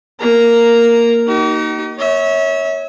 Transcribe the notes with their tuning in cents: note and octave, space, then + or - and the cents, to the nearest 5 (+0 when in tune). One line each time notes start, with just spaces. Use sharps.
A#3 +0 A#5 -5
D#4 +5 G4 -45
C#5 +0 E5 -30